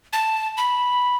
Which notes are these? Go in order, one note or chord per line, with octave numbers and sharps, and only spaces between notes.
A5
B5